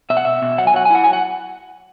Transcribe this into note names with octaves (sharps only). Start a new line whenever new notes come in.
B2 E5
F#5
B2 E5
B2
F#3 F#5
G#5
F#3 F#5
G#5
E4 F#5
F#3 G#5
F#5